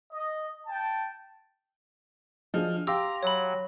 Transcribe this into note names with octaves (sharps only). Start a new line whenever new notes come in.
D#5
G5 A5
F3 D4 G#4 D#5 F6
G4 F5 A#5 C6 D6 E6
F#3 C#5 B5